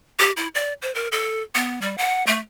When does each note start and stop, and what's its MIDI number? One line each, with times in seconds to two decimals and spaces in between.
0.19 0.32 67
0.37 0.48 64
0.55 0.73 74
0.82 0.93 72
0.95 1.08 70
1.12 1.42 69
1.55 1.81 59
1.81 1.96 55
1.98 2.25 78
2.27 2.39 57